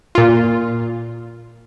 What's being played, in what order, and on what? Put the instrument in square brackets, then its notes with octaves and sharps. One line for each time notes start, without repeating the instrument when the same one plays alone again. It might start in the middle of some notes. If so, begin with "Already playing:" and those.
[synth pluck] A#2 F4